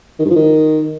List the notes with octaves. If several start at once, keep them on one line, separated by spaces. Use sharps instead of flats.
D#3
G2
F3
D#3